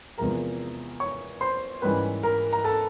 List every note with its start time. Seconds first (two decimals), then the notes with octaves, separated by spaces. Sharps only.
0.18 E2 C3 F3 G#3 A#4 A#5
1.00 C#5 C#6
1.41 C5 C6
1.82 G#2 E3 G3 A#3 C#4 B4 B5
2.23 A#4 A#5
2.53 A#5
2.64 A4 A5